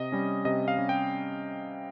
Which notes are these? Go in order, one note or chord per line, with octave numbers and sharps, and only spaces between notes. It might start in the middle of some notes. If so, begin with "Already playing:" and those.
Already playing: C3 D#5
G3 C#4
C3 D#5
F5
G3 C#4
G5